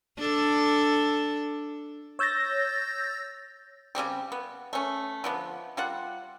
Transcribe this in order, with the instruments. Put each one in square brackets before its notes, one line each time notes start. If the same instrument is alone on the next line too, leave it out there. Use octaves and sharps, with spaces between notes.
[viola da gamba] D4 A4
[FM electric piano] C#5 E6 G6 A6 A#6
[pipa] C#3 G3 C4 G4
B3
A3 C#4
D3 F3 B3
G3 F4 F#5